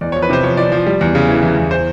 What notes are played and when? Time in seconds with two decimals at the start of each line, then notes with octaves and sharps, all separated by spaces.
0.01 E2 D5
0.12 C#5
0.16 F3
0.22 B4
0.30 C3 C5
0.43 F3 C#5
0.57 F3 D5
0.72 F3
0.87 G3
1.01 E2
1.15 C#3
1.28 E3
1.43 E3
1.57 E2
1.71 C5